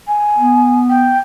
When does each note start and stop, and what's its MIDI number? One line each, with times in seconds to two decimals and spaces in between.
0.07 0.78 80
0.38 1.17 59
0.89 1.18 79